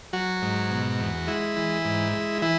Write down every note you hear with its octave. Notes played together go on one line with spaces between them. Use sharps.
F#3 F#4
G#2
B2
E2
G#3 E4
E3
G#2
G#3
E3 E4